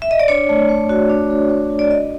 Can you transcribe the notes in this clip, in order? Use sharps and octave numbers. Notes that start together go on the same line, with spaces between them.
E5
D#5
D5
D4 C#5
A3
A3
F#4
D4
A3
A3
F#4
D5
D4 D#5